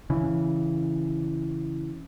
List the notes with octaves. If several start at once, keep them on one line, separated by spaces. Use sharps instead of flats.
C#3 E3